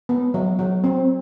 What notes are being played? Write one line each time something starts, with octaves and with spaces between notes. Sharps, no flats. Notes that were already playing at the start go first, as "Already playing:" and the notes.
B3
F#3
F#3
C4